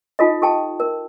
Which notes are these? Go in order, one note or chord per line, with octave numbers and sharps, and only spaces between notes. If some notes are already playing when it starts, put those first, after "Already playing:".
D#4 F4 A4 D#5
G4 A4 G5 A5
A#4